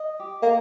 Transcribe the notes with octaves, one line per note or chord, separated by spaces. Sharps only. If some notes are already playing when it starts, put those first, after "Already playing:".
Already playing: D#5
G4
A#3